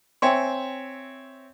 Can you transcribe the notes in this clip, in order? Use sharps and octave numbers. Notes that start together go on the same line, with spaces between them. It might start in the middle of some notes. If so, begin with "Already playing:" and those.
C4 C#5 E5 G5 G#5 C6